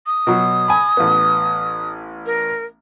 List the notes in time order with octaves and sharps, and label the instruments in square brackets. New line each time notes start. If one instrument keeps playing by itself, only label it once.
[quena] D#6
[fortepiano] B2 F#3
G#5 B5
A1 B3
[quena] A#4